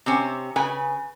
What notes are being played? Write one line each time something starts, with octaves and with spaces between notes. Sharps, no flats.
C3 C4 C#4
C#3 B4 G#5